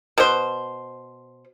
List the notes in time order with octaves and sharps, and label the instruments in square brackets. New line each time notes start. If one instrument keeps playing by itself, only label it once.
[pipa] B2 C5